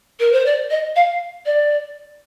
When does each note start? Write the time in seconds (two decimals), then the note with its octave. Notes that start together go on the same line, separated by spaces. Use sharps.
0.19 A#4
0.32 C5
0.45 D5
0.70 D#5
0.95 F5
1.45 D5